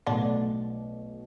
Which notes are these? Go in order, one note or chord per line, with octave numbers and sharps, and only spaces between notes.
B1 B2 D3 A3 D4